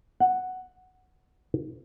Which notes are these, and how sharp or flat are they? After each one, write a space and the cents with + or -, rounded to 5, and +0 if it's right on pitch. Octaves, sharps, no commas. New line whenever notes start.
F#5 +0